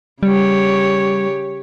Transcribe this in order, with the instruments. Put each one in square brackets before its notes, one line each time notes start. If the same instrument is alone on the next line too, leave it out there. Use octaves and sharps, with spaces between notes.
[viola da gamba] C#3 G4 C#5 [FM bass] G3